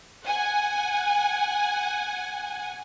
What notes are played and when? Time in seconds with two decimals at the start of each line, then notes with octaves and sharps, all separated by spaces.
0.25 F#5 G#5